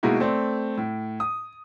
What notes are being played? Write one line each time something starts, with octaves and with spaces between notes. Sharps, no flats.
B2 G#3 A#3 D#4 E4 F#4
A3 C4 D5
A2
D#6